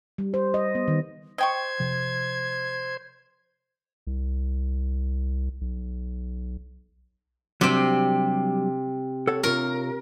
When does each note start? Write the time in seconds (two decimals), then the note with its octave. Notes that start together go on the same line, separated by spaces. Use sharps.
0.18 G3
0.34 C5
0.54 D#5
0.75 B3
0.88 D#3
1.38 C5 D#5 G5 C#6 G#6
1.80 C3 F3
4.07 C2
5.61 B1
7.61 C3 F#3 G3 C4 D4
9.27 A4 C#5 F#5
9.43 C3 F4 A#4 C#5